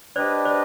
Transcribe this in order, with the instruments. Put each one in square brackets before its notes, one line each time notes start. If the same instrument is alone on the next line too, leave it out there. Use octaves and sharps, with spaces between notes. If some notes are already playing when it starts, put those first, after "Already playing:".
[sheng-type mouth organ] D4 G4 B4 D#5 [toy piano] C5 D5
[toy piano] C5 D5